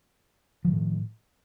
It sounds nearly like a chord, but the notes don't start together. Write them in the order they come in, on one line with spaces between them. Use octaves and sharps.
F3 D#3 A3 A2